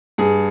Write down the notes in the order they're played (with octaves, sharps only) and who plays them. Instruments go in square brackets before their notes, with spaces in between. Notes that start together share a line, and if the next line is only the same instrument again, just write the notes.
[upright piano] G2 G#4